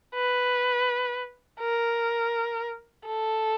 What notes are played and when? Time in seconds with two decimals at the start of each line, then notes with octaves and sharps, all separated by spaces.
0.14 B4
1.61 A#4
3.07 A4